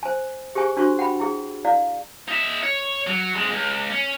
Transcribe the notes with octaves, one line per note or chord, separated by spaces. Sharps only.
C5 G#5
G4 G#4 C5 G#5 C#6
D4 F#4 C5 C#6
F#5 G5 B5
E4 G#4
E4 D5 F5
D#4 E5
C#5
F#3
F2 G#3
C#2
C#4